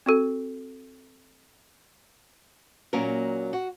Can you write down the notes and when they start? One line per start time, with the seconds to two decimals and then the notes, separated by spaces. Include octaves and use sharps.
0.06 C4 F#4 A4
2.93 A#2 F#3 A#3 C#4 A#4
3.53 F#4